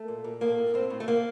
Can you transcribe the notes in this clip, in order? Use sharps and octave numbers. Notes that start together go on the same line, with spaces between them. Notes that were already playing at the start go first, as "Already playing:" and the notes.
Already playing: A3
A#2
A#2
A2 A#3
A2
A2 C4
A2
A3
A2 A#3